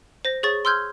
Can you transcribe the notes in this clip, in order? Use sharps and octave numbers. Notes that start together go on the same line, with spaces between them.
C5 A#6
G#4 C#5 C#6 A6
C6 E6 F6 G6 G#6